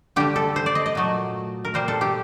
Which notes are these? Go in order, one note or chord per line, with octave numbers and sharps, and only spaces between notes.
D3 G3 G4
A4
C5
D5
D#5
D#5
A#2 F#3 A3
A#4
A#2 G3 C5
A4
G4